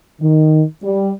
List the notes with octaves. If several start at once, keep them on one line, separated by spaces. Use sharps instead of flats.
D#3
G3